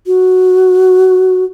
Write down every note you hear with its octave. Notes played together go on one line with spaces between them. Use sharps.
F#4